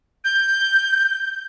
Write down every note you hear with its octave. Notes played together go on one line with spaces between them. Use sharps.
G6